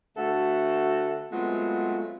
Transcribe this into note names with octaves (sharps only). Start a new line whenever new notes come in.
D2 A3 F#4 A4 E5 F#5
F#3 G#3 A3 B3 C4 F4